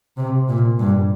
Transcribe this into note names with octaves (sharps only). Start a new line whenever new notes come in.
C3
A#2
G2